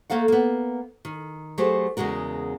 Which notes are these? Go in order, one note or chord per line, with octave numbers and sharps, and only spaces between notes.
A3 A#3 A4 F5 F#5
A#3 B3
D#3
F#3 A3 G4 G#4 C5
E2 C#3 G#3 F#4 A#4